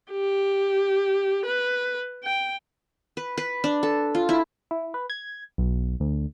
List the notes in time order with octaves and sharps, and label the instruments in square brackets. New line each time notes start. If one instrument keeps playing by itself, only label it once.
[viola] G4
B4
G5
[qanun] B4
B4
D4
A4
F4
E4
[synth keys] E4
B4
G#6
B1
D2